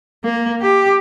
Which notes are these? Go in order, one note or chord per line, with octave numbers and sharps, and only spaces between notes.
A#3
G4